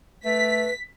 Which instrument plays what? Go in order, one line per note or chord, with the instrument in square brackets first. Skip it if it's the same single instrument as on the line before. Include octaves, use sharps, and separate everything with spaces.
[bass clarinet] A3 [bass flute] B4 [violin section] B6